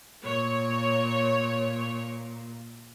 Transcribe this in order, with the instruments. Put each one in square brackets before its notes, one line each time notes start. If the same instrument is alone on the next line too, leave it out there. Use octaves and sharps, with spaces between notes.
[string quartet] A#2 [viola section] C#5